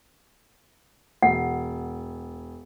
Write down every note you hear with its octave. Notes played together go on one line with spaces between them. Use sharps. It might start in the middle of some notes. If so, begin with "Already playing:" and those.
E1 F#5